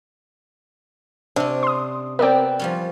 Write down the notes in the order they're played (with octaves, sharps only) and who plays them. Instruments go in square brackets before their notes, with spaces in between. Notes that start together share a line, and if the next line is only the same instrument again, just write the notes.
[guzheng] C3 C#4 [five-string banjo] D4
[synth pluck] C6 D#6
[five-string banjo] B3 C4 [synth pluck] A#4 D5 G5
[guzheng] F3 G3 C#4